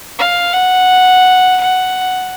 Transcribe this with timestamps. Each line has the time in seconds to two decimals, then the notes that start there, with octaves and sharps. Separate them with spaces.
0.19 F5
0.53 F#5
1.61 F#5